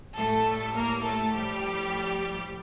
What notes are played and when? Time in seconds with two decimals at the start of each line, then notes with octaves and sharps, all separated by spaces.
0.16 A2 G3 A3 A4
0.75 A#3 A#4
1.05 A3 A4
1.34 A2 F3 G3 G4